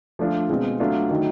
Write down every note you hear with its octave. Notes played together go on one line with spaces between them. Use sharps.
F3 A3 D4 F4
B2 G#3 C4 F4
F#3 A3 D4 F4
D#3 F#3 A3